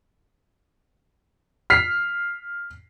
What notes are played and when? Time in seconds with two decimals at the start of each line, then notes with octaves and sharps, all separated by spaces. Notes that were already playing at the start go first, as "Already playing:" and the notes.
1.70 F6 B6 C7